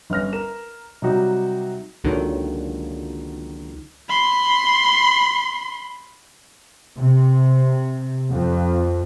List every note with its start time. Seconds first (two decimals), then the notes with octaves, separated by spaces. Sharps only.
0.10 G1 C#4 F6 A#6
0.33 A#4 E7
1.02 C3 F#3 G3 D#4 F#4
2.04 C#2 A#2 D3 D#3 F#3
4.09 B5 C6
6.97 C3
8.32 F2